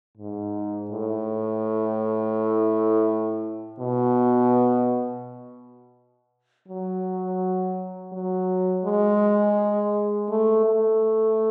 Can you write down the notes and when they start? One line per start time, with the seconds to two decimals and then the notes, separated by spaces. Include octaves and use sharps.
0.17 G#2
0.90 A2
3.79 B2
6.68 F#3
8.13 F#3
8.85 G#3
10.30 A3
10.66 A3